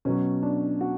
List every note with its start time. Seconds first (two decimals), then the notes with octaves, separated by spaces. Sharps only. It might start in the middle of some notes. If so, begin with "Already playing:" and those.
0.05 B2 F#3 C#4
0.43 D4
0.81 F#4